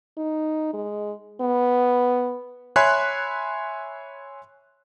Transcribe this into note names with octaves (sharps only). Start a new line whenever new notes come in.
D#4
G#3
B3
C#5 E5 G#5 B5 C6 F#6